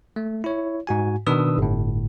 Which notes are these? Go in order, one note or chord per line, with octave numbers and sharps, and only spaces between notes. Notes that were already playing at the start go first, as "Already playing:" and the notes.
A3
E4 C#5
G#2 F#4 G#5
B2 D#3 D4 B4 D#6 E6
G1 A2